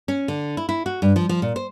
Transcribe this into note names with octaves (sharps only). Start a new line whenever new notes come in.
C#4
D3
E4
E4
F#4
G2
F3
F3
A#2
C5